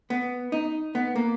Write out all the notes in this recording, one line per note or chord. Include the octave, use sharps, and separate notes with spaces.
B3
D#4
B3
A#3